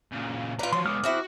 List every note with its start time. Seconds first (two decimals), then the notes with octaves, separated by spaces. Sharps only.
0.12 A#2 C#3
0.59 F4 B4 D5 A#5
0.73 F3 F#3 C#5 C6
0.86 G#3 B3 D6 D#6 F6
1.04 E2 C4 E4 F#4